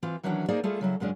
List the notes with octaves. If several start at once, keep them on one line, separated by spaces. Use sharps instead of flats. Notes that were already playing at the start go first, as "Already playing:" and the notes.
E3 C4 F4
D#3 E3 F#3 C#4 D4 F#4
A#3 D#4 G#4 A#4 C5 D5
G3 A3 F4 G#4 A4
C#3 F#3 E4 G#4
F#2 C#3 G#3 C#4 D4